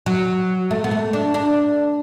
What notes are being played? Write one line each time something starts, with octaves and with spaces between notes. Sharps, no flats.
F#3
A3
B3
A3
D4
D4